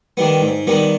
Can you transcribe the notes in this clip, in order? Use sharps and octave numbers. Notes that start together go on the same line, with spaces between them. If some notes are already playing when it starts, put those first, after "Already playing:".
D#3 G3 B3
G#2
D#3 G3 B3